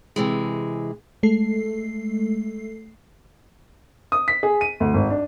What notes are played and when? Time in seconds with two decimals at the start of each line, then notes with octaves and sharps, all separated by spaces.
0.16 C3 E3 G#3
1.23 G#3 A3 A4 C7
4.12 D#6
4.28 B6
4.43 G#4
4.61 D#7
4.80 D2
4.94 G#1
5.10 D4